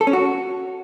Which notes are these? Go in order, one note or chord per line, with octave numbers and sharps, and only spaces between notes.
A4
C#4
F#4